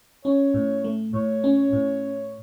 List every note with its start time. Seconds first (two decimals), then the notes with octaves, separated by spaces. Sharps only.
0.25 C#4 C#5
0.54 A2
0.84 A3
1.14 A2 C#5
1.44 C#4
1.73 A2